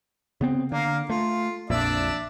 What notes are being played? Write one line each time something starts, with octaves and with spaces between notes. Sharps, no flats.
C#3 B3 C4
D3 A#3 F5
A3 F4
A#1 F2 A#2 D4 D5 E5